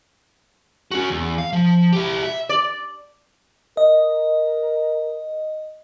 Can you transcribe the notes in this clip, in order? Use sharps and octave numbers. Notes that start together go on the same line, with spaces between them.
C#4 F#4
E2
F5
F3
E4 G4
E5
D5
A#4 D#5